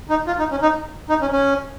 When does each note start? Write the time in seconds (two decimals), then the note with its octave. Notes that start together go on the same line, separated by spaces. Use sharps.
0.10 D#4
0.27 F4
0.39 D#4
0.51 C#4
0.62 D#4
1.09 D#4
1.21 C#4
1.33 C#4